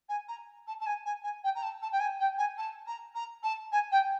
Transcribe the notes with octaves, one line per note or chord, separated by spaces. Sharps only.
G#5
A#5
A5
A5
G#5
G#5
G#5
G5
A#5
A5
A5
G5
G#5
G5
G#5
A5
A#5
A#5
A5
G#5
G5